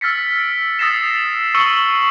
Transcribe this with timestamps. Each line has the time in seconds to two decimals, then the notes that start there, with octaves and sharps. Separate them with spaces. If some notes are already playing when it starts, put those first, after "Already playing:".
0.01 E6 F6 A6 B6 C#7
0.39 D7
0.79 D#6 E6 A6 A#6 C7 E7
1.54 C#6 E6 C#7 F#7 G7